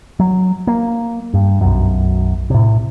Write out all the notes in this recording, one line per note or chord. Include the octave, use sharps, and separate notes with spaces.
F#3
A#3
G2
B1 F#2
A2 C3